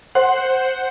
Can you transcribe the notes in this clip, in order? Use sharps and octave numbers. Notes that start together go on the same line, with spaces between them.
C5 F#5